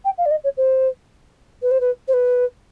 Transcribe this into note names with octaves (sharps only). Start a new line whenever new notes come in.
G5
F5
D5
D#5
C#5
C5
B4
C5
B4
C5
B4